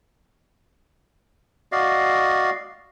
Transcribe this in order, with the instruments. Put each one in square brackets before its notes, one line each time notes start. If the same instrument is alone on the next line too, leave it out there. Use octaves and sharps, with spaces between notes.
[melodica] F#4 D5 D#5 F5